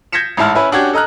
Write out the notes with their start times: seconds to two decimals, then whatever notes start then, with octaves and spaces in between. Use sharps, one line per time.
0.12 G6 G#6 A#6 B6 C#7 E7
0.37 A1 G#2 E4 A5 F6
0.55 C#4 E4 B4
0.72 C#4 D4 F#4 G4 G#6
0.93 A4 D#5 A#5 F6 F#6